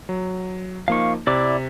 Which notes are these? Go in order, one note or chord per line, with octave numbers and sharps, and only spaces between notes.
F#3
F3 A#3 D#4 F5 C#6
C3 E4 D5 D6